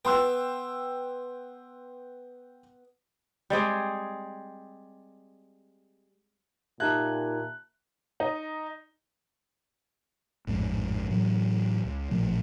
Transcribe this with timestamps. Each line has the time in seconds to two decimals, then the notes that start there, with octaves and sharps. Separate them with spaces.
0.05 B3 G5 C6 E6
3.50 G3 G#3 C4 G#4
6.80 A#2 D#4 G4 E5 A5 A#5 F#6 G#6
8.20 D#4
10.47 A1 F2 G#2
11.10 A2 E3 F#3
11.85 C#2
12.11 A1 A#2 F3 A3